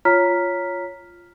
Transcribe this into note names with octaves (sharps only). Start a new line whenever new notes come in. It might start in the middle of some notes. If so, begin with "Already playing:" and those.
F4 C#5 A#5 F6 B6